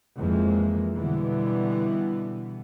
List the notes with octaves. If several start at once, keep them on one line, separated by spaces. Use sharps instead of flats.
F2 E3 F3 G#3 A#3
B2 D3 E3 G3 B3